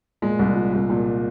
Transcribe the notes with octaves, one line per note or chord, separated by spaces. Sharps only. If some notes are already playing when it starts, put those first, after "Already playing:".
A#2 G#3
C2
F3
C2
A#2